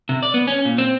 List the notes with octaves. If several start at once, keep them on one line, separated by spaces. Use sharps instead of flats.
C3
D5
B3
C#4
A#2
C4